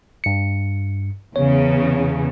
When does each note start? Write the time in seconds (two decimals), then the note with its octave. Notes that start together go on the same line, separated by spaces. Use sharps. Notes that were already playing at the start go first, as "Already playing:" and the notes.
0.24 G2 C#7
1.36 E2 C#3 C#5